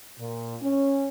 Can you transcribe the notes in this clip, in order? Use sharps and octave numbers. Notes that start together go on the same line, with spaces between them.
A#2
C#4